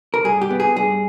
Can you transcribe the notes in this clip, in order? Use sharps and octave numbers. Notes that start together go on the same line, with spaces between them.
A#4
G2 G#4
G4
B3
G#4
G2 G#4